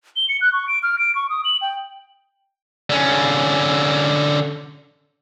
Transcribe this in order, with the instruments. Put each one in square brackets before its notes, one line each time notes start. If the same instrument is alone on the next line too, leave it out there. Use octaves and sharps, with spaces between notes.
[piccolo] G7
C#7
F#6
C#6
D7
F6
D7
C#6
D#6
F#7
G5
[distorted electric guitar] D3 C#4